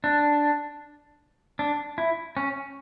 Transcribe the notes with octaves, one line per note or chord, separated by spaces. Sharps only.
D4
D4
E4
C#4